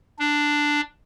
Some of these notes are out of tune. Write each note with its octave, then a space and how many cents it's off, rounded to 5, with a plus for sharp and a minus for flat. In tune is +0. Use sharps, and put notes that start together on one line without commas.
D4 +5